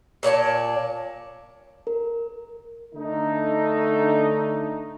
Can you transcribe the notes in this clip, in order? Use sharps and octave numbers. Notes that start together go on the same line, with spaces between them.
A#2 C#5 D5 A5
A#4
D3 A3 D#4